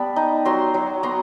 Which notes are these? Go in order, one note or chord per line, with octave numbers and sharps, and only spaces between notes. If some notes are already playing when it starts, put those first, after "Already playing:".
Already playing: G3 B3 A5 B5
D#4
F#3 A#5 C6
F#3
B3 A#5 C6